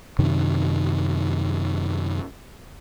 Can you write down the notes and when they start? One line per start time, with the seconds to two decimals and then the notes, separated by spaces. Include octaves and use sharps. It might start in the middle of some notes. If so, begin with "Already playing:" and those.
0.19 F#2 C3 D#3